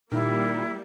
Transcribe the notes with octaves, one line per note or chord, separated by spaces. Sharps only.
A#2 D#3 G3 A#3 E4